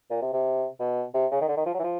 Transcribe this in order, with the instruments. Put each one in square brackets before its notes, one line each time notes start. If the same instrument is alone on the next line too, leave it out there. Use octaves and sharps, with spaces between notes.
[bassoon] A#2
C3
C3
B2
C3
C#3
D#3
D3
D#3
F3
F#3
E3
F3